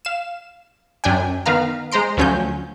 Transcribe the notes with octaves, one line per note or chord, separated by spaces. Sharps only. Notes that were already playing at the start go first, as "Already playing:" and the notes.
F5 E7
F#2 D4 G5 G#5
D#3 B3 B4 F5 A#5 F6
G#3 C5 A#5 C6 D7
D2 F3 F#3 C#4 G#5 G6